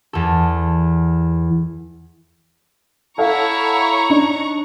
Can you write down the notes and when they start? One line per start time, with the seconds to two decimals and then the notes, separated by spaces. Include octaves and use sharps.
0.13 E2 A4
3.18 E4 A4 C#5 F5 F#5 A#5 C#6
4.10 D4 D#4